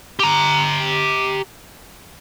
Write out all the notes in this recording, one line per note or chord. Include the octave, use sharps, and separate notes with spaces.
G4 A#5